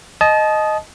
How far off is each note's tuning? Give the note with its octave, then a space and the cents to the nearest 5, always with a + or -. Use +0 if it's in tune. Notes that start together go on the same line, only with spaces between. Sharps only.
D#5 +0 A5 -30 D#6 +0